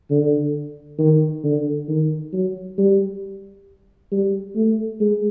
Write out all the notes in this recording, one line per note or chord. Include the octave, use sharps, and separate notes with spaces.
D3
D#3
D3
D#3
F#3
G3
G3
A3
G#3